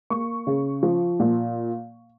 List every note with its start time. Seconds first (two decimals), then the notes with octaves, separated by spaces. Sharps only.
0.10 A#3 C#6
0.47 C#3
0.83 F3
1.20 A#2